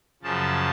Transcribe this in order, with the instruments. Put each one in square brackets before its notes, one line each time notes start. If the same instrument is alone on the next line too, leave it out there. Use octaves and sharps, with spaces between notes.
[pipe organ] F#2 C#3 F3 A5